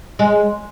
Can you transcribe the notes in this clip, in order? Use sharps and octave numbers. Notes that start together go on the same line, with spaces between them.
G#3